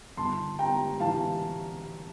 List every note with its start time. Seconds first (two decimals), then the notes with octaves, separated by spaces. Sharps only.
0.17 G1 A5 C6
0.59 G3 G5 A#5
1.00 E3 F5 A5